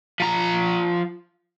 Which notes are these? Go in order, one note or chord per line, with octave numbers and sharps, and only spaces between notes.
F3 A#5